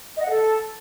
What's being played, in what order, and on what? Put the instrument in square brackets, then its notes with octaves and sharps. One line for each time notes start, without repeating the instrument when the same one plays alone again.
[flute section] D#5
F#5
A4